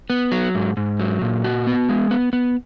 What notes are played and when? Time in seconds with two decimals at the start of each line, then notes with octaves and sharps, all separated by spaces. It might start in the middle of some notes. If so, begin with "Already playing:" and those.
0.10 B3
0.32 F#3
0.55 G#2
0.77 G#2
1.00 F#3
1.22 A#2
1.44 F#4
1.67 B3
1.89 G#3
2.11 B3
2.33 B3